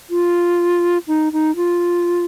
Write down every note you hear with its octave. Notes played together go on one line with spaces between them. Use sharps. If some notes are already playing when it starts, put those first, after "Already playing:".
F4
D#4
D#4
F4